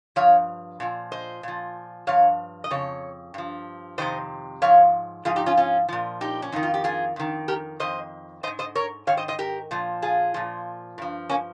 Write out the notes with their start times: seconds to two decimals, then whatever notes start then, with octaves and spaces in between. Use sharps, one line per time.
0.16 G2 F3 C#5 F5
0.80 A#2 F3
1.12 C5 D#5
1.43 A#2 F3
2.07 G2 F3 C#5 F5
2.64 D#5
2.71 F2 C#3 C#5
3.34 G2 F3
3.98 F2 C3 D#3 C5 D#5
4.62 G#2 F3 C#5 F5
5.25 G#2 F3 F4 G#4
5.36 D#4 G4
5.46 C#4 F4
5.57 C#4 F4
5.89 A#2 F3
6.21 D#4 G4
6.42 C#4
6.52 F2 D#3 D#4
6.63 F4
6.74 G4
6.84 F4 G#4
7.16 F2 D#3
7.48 G4 A#4
7.80 F2 D#3 C5 D#5
8.43 D#3 C5 D#5
8.47 G#2
8.59 C5 D#5
8.75 A#4 C#5
9.07 G#2 D#3 C#5 F5
9.17 C5 D#5
9.28 C5 D#5
9.39 G4 A#4
9.71 A#2 F3
10.02 F4 G#4
10.34 A#2 F3
10.98 G2 F3
11.29 A#3 C#4